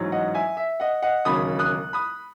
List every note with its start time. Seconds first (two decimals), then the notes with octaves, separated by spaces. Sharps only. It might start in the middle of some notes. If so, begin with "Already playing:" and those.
Already playing: A1 G#2 F#3
0.12 D#5 F#5
0.34 E5 G#5
0.57 E5
0.80 D#5 F#5
1.02 D#5 F#5
1.25 E1 D#2 C#3 F#3 B5 D#6
1.59 D#6 F#6
1.93 B5 D#6